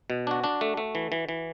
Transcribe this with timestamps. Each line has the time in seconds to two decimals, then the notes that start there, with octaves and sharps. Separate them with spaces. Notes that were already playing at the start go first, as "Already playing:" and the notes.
0.10 B2
0.27 D4 F#4
0.44 D4
0.61 A3
0.77 A3
0.95 E3
1.12 E3
1.29 E3